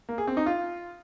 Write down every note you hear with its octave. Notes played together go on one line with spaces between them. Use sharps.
A#3
G#4
C4
D#4
F4